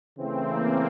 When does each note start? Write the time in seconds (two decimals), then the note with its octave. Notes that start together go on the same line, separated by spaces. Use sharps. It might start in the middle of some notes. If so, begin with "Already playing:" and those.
0.17 C#3 E3 A3 C4
0.48 A#3